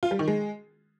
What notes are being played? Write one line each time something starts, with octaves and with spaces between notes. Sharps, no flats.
F4
G3
D#3
G#3